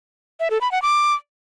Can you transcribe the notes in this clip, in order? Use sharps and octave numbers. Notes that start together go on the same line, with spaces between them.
E5
A4
B5
F#5
D6